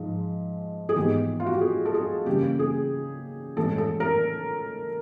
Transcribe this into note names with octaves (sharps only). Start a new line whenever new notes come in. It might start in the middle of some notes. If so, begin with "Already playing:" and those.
Already playing: G#2 F3 G#3
G#4
G#2 E3 G#3 B3 G4
F4
F#4
G4
G#4
A4
G#4
C#3 E3 G3 A#3 G4
G#4
A2 E3 G#3 A4
A4
A#4